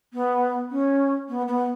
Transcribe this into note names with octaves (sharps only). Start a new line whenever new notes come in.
B3
C#4
B3
B3